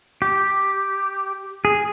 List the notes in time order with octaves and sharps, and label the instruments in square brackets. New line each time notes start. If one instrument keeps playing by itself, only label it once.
[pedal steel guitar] G4
G#4